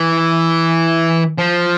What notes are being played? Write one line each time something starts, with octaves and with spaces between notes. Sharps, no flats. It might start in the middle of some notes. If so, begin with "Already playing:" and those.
Already playing: E3
F3